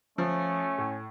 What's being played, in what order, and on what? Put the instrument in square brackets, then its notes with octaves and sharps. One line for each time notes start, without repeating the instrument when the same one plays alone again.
[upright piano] F3 [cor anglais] A3 [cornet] C#4
[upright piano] A2